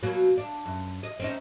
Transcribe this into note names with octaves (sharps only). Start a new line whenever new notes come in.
B2 F#3 A#3
D4
F#2
D#5
C4 C#4 D#4